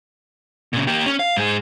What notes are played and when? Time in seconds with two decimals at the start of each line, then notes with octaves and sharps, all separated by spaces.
0.73 A#2 C#3
0.87 A#3 G4
1.06 C#4
1.19 F5
1.37 G#2 G#4